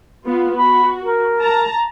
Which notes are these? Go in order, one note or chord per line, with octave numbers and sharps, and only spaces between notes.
B3 F4
F#4 B5
A#4
A5 A#5